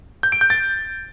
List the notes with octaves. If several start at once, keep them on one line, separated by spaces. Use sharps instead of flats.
G6
D7
G6
A6